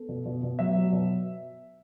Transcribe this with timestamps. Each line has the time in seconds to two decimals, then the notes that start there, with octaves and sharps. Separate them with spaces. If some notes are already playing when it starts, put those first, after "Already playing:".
Already playing: B3 A4
0.09 B2
0.26 B2
0.43 B2
0.59 F#3 E5
0.76 F#3
0.92 B2